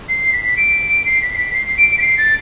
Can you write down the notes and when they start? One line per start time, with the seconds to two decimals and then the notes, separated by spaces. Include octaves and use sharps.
0.09 C7
0.33 B6
0.57 D7
1.05 C7
1.22 B6
1.34 C7
1.38 B6
1.54 C7
1.78 D7
1.92 D7
1.98 B6
2.02 C7
2.18 A6